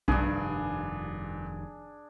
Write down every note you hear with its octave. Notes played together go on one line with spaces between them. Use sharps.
F1 B1 G2 D#3 G3 D4 G#4